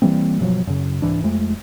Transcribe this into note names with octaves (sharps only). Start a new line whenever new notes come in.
E3 G3 A#3 C4
G2 B2 F3 F#3
F#2 C#3
C2 G#2 E3 D4
F2 G#3 A3